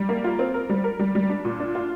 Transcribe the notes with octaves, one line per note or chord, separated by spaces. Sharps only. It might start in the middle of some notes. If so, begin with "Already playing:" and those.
Already playing: G3
A#3
F4
C4
A#4
G3
A#4
G3
G3
D4
A#2
D4
F4